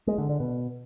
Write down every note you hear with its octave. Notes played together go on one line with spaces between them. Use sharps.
G#3
D3
D3
B2